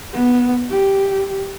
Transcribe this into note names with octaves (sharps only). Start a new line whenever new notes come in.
B3
G4